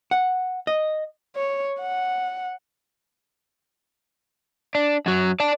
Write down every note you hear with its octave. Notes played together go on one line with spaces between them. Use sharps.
F#5
D#5
C#5
F#5
D4
F#2 F#3
D5 A5